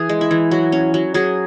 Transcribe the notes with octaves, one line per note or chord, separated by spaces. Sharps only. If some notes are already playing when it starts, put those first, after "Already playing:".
Already playing: E3 G#4
G#3
E4
E3
F#3 F#4
C#4
F#3
F#3 G#4